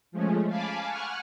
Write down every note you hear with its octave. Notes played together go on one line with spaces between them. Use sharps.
F3 G#3 A3 C#4
F5 G#5 A5 B5 D6
F#5 G#5 C#6 F6 F#6